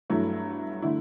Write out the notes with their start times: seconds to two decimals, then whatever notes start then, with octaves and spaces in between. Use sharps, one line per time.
0.10 G2 F#3 A3 E4
0.82 D3 A3 E4